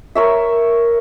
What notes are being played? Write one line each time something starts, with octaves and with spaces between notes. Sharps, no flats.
A#4 C#5 E5